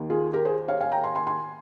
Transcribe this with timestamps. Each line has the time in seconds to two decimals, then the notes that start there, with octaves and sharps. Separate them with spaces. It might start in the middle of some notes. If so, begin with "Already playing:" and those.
Already playing: D#2 D#3
0.10 F4 G#4
0.33 G4 A#4
0.45 G#4 C5
0.68 C#5 F5
0.81 F5 G#5
0.92 G5 A#5
1.03 G#5 C6
1.15 G#5 C6
1.27 G#5 C6